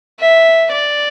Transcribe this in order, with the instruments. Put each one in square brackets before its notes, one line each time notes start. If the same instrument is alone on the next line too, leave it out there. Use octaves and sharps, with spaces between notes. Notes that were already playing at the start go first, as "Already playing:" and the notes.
[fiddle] E5
D5